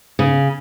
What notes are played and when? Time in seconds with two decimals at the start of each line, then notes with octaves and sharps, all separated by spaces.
0.19 C#3